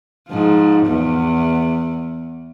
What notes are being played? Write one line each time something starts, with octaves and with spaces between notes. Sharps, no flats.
G#2 F3
E2